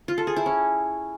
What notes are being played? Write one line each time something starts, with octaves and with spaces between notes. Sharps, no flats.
F4
A4
G#4
E4
C#4